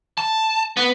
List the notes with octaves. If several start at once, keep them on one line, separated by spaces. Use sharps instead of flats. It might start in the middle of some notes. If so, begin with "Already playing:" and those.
A5
B3